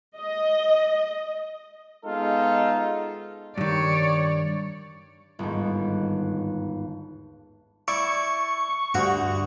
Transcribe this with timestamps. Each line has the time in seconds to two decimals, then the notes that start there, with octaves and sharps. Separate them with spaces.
0.17 D#5
2.06 G#3 B3 D#4 F4 A4
3.58 G2 D#3 C#5 D5
5.39 G1 D#2 G#2
7.88 E4 D5 C#6
8.94 D2 G2 F#4 C#6